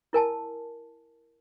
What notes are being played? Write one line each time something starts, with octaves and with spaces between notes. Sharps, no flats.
E4 A#4 G#5 A5